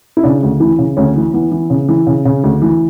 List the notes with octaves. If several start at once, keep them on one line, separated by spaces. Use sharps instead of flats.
E4
C#3 D4
D2
E3 E4
C#3
D2 C#4
E3
E3 B3
E3
C#3
E3
C#3
C#3
D2
E3